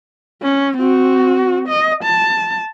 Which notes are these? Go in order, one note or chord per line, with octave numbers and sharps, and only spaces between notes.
C#4
C4 F#4
D#5
A5